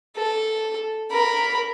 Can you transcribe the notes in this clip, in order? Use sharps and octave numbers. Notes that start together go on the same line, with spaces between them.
A4
A#4 B5